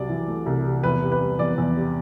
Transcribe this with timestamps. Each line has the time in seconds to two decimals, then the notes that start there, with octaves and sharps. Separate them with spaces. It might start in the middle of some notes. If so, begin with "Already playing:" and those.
Already playing: C2 C3 F#3 D5
0.09 E3
0.28 A3
0.46 C2
0.65 C3
0.84 E2 B4
1.02 C3
1.12 B4
1.21 G3
1.39 E2 D5
1.58 E2
1.76 C3